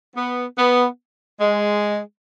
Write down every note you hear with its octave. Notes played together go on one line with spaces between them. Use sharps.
B3
B3
G#3